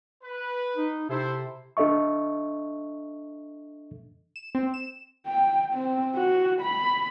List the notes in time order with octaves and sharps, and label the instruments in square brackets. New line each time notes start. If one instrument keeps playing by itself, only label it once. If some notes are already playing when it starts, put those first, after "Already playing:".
[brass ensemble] B4
[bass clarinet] D#4
[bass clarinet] C3 [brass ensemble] E4 A4 C5
[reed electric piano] D4 A4 D#5 E5 C#6
[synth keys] E7
C4
E7
[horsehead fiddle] G5
C4
F#4
B5